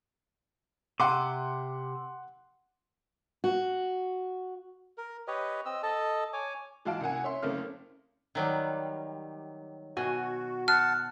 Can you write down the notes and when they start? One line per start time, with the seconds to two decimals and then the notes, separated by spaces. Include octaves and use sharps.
1.00 C3 F#5 C6 D6
3.44 F#4
4.98 A#4
5.28 G4 B4 C#5 D#5
5.66 C4 D#5 E6
5.83 A4 D#5 A5
6.33 C#5 G#5 D6
6.85 E3 G#3 F#4 F5 A5 D7
7.01 C2 A#3 F#5 G#5
7.24 C#5 E5 C6
7.42 F#1 C#3 A3 A#3 C4 F6
8.35 D#3 F#3 G3
9.97 B2 F#4 G#5
10.68 F#5 A5 F6